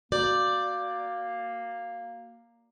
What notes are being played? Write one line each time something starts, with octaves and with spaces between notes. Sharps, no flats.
A#3 F#4 D5 G6 F#7